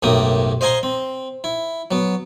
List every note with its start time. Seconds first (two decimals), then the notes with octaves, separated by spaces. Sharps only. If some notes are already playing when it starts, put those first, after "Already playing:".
0.03 B1 F#2 A2 A#3 G4 D#6
0.61 C5 D#5 F5 G#5 A#5 C6
0.83 C4
1.44 E4
1.91 F#3 B3